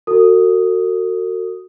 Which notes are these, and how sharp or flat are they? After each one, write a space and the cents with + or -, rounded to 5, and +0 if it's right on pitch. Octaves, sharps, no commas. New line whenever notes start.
F#4 +0 A4 +45 D#6 +0